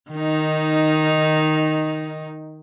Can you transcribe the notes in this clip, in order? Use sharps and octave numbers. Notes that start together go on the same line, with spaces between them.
D#3 D#4